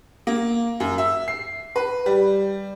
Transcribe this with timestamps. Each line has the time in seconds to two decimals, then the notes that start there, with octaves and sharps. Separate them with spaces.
0.27 A#3
0.80 F#2
0.98 E5
1.28 C7
1.76 B4
2.06 G3